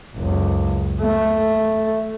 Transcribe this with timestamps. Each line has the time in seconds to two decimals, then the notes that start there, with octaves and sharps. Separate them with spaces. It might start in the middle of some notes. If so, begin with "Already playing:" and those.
0.15 F#1 C#2
1.00 A3